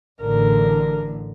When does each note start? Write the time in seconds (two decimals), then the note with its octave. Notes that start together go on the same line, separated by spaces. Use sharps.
0.22 A1 A2 D3 A#4